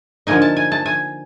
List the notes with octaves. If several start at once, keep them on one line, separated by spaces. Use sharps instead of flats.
D3 F3 A#3 D#4 G#5
A5
G#5
A5
G#5